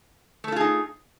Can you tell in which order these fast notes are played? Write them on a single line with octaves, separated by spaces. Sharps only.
A3 A4 F4 G#4 D#4